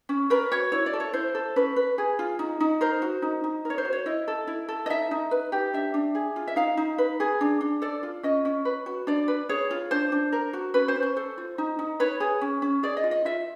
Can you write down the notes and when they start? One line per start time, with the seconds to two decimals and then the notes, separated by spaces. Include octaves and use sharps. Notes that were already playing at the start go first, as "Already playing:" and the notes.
0.09 C#4
0.30 A#4 B4
0.52 F#4 C#5
0.72 E4 C#5
0.86 D5
0.93 A4
1.00 C#5
1.13 E4 C5
1.35 A4
1.56 C#4 B4
1.76 B4
1.98 G#4
2.19 F4
2.39 D#4
2.60 D#4
2.81 A#4 C5
3.02 F#4
3.22 D#4
3.44 D#4
3.65 A#4
3.70 C#5
3.78 C5
3.85 F#4
3.93 C#5
4.06 E4 D#5
4.28 A4
4.47 E4
4.69 A4
4.86 D#5
4.90 D#4 E5
5.11 D#4
5.31 B4
5.52 G4
5.73 D4 E5
5.94 D4
6.15 G#4
6.36 F4
6.48 E5
6.56 D#4 F5
6.77 D#4
6.98 B4
7.20 G#4
7.41 D4
7.61 D4
7.82 A4 D5
8.03 F4
8.23 C#4 D#5
8.45 C#4
8.65 B4
8.86 F#4
9.07 D4 D5
9.28 B4
9.49 G#4 C#5
9.71 F4
9.91 D4 C5
10.12 D4
10.32 A#4
10.53 F#4
10.74 C#4 B4
10.88 C5
10.95 C#4
11.03 C5
11.16 A4 C5
11.38 F4
11.58 D#4
11.79 D#4
12.00 B4 C#5
12.20 G#4
12.41 C#4
12.62 C#4
12.83 G#4 D5
12.97 D#5
13.04 F4
13.11 D#5
13.25 F4 E5